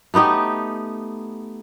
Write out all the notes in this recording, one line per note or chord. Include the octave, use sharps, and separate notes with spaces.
A3 B3 D#4 G4